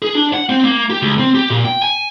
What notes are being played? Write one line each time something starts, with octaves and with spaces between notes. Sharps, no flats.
G#4
D4
F#5
C4
A#3
G4
C#2
C4
G4
A#2
G5
G#5